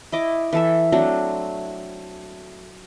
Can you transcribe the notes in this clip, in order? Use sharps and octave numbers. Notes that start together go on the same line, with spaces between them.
E4 D#5 D6
E3 A4 E5
F#3 A3 C4 D4